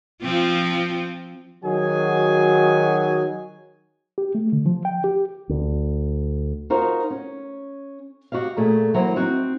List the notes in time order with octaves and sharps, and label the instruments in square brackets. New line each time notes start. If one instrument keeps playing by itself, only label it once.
[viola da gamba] F3 C4 F4
[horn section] D#3 F#3 F#4 G#4 G#5
[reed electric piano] G4
A3
D3
F3
G5
G4
[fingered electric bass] D2
[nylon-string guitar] D#4 F4 F#4 A#4 C5
C#4
F#4 G4 D#5 F5
A#2 A3 G#4
E3 F#3 A#3 C5
C4 D#4 F#4